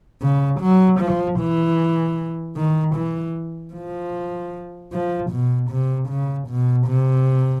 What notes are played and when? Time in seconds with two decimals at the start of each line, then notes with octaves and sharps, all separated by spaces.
0.22 C#3
0.61 F#3
1.00 F3
1.40 E3
2.57 D#3
2.95 E3
3.74 F3
4.93 F3
5.31 B2
5.71 C3
6.09 C#3
6.48 B2
6.88 C3